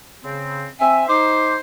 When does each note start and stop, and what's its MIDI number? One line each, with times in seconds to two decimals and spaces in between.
0.24 0.67 49
0.24 0.67 60
0.80 1.03 60
0.80 1.03 76
0.80 1.07 80
1.08 1.59 63
1.08 1.59 72
1.08 1.54 86